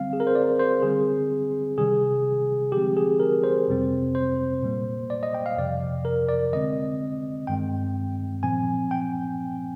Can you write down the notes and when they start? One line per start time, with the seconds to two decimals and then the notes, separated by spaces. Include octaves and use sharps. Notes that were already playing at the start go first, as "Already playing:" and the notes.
Already playing: D3 G3 C4 F5
0.13 G#4
0.20 A#4
0.27 C5
0.35 D5
0.59 C5
0.83 D3 G3 C4 G#4
1.78 C3 D#3 G3 G#4
2.72 D3 F3 G#3 C4 G4
2.96 G#4
3.20 A#4
3.44 C5
3.68 F2 C3 G3 C4
4.15 C5
4.63 A#2 G3 A#3
5.10 D5
5.23 D#5
5.34 G5
5.46 F5
5.57 F2 C3 F3 D5
6.05 A#4
6.29 D5
6.53 D3 G#3 C4 D#5
7.47 G2 D#3 G#3 C4 G5
8.43 A#2 F3 C4 G#5
8.91 G5